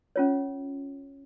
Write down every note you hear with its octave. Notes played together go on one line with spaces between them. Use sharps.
C#4 F4 C#5